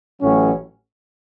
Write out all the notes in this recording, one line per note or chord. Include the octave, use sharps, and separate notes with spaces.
A1 A2 F#3 C#4